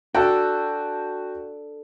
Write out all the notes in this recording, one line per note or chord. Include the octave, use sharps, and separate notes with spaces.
D4 F#4 A4 G5